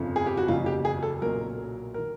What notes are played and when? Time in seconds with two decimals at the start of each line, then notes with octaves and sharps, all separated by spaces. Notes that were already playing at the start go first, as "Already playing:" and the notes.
Already playing: G1 F2 C#3 F3
0.16 G#4
0.26 G4
0.37 F#4
0.48 F#1 E2 C#3 F#3 F4
0.66 G4
0.85 G#4
1.03 A4
1.22 B1 A#2 F#3 A#4
1.94 D#3 A#4